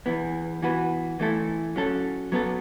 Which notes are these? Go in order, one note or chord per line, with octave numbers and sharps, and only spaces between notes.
E2 E3 B3
E3 B3 F#4 B4
E3 A3 E4 A4
F#3 C#4 A4
F#3 B3 A4